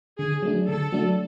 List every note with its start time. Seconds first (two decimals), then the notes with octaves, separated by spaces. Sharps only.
0.19 D3 G#4
0.43 F#3 A3 D4
0.68 D3 A4
0.92 F#3 A3 D4